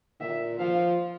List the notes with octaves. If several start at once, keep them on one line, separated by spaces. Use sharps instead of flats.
A#2 E5
F3 F5